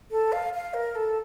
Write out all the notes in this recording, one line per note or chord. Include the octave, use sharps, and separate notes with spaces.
A4
F5
F5
A#4
A4